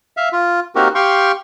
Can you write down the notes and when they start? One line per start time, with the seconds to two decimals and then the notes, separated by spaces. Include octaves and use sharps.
0.17 E5 F5
0.33 F4
0.75 A#3 C4 D#4 F#4 G4 A#4
0.95 G4 F5 G5 C6 C#6